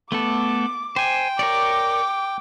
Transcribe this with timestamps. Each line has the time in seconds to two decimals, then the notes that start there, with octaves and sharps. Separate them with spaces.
0.12 A3 B3 A4 D6
0.96 C5 G5 G#5
1.39 A#4 C#5 D5 D6